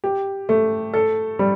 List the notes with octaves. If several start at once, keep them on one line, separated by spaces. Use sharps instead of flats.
G4
A3
A4
G3